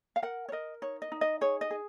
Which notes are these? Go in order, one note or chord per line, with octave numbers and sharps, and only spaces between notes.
F5
A#4 F#5
C#5
A#4 D#5
D#4 C#5
D#5
D#4
D#5
G#4 C#5
D#5
G#4